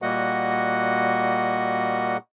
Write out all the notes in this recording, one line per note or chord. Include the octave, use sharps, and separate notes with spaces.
A#2 G3 A#3 F#4 D#5 F#5